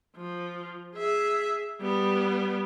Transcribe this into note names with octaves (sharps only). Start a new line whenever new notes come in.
F3
G#4 E5
G3 B3